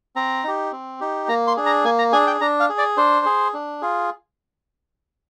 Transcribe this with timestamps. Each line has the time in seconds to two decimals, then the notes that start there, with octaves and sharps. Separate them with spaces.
0.16 C4 A#5
0.44 D#4 G4
0.72 C4
1.00 D#4 G4
1.28 A#3 A#5
1.47 C6
1.57 D4 G#4
1.66 A#5
1.84 A#3 G#5
1.99 A#5
2.13 D4 G#4 G#5
2.27 G5
2.41 D4 A#5
2.60 F5
2.69 G#4
2.78 D5
2.97 D4 C5
3.26 G#4
3.54 D4
3.82 F4 G#4